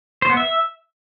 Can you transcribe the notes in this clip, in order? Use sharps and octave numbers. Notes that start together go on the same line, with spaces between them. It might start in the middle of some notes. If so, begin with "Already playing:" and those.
C5
B3
E5